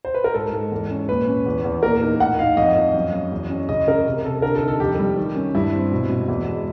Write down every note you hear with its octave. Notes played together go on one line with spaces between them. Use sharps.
C5
B4
A#4
G#2 A4
G#2
E2
C#4
A#2 B4
C#4
E2
E2
A#2 A#4
D#4
A2 F#5
D#4 F5
F2 D#5
F2
F#2
F#2
E2
C#4
C#3 D#5
C#3 A#4
C3
C3 A4
D3 A#4
A4
D#4
A4
F2 G4
G3
D#3
C#4
G2 E4
C4
B2
B2
E2 E4
G#3